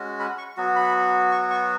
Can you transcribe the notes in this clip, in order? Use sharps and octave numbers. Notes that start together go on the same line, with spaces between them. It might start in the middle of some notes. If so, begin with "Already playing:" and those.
Already playing: G#3 C#4 F#4
B5
C#6
F#3 B3 F#4
B5
C#6
C#6